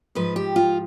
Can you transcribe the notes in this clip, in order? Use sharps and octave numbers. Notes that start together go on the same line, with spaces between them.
G#2 F3 B4
G4
F4